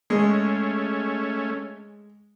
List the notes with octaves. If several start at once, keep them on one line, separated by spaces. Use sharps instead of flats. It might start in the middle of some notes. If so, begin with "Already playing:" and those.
G#3 A3 C#4